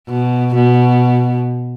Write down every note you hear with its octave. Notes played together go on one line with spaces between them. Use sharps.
B2
B2